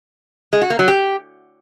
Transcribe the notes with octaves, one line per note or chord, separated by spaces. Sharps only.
G#3
F#4
A#3
F#3
G4